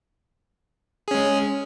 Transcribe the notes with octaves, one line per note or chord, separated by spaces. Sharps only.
G#3 C#4 G#4